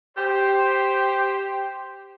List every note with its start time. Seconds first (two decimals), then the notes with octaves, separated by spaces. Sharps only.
0.18 G4 C5